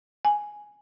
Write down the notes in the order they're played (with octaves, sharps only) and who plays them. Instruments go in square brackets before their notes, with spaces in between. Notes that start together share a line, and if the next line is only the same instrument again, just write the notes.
[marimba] G#5